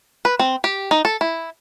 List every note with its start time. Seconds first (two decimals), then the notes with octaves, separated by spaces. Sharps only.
0.25 B4
0.39 C4
0.64 G4
0.91 D#4
1.05 A4
1.21 E4